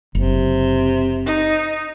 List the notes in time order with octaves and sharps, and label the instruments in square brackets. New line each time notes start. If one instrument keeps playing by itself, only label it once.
[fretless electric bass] F#1 [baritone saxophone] C3
[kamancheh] D#4